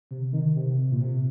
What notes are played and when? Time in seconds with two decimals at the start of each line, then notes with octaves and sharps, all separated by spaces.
0.11 C3
0.33 D#3
0.56 C3
0.91 A#2
1.01 C3